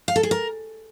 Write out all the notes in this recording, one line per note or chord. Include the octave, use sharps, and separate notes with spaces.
F5
A4
G#4
A#4